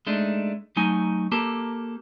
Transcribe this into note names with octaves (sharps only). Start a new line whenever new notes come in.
G#3 A3 D4 D#4
F#3 A3 D#4 G#5
A#3 G4 A4 A#4